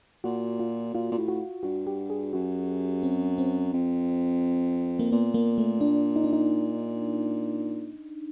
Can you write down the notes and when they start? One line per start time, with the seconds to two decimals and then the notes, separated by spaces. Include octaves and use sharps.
0.24 A#2 F#4
0.60 F4
0.94 A#2 F4
1.11 A#2
1.17 A2
1.28 F#4
1.63 G2 F#4
1.87 G4
2.10 G#4
2.33 F#2 F#4
3.03 C4
3.38 C4
3.73 F2
4.99 A#3
5.12 A#2 B3
5.34 A#3
5.58 A3
5.81 D4
6.16 D#4
6.24 D4
6.33 D#4